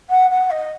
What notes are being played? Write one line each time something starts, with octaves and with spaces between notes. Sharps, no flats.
F#5
F#5
D#5